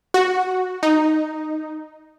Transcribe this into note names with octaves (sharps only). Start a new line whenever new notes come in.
F#4
D#4